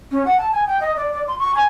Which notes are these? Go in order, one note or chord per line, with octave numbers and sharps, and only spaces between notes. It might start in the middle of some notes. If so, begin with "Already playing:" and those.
C#4
F#5
A5
G#5
G5
D#5
D5
D5
C6
C#6
G#5